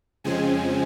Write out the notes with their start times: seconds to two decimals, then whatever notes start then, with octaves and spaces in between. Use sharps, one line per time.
0.24 F2 C#3 F3 G#3 C4 G#5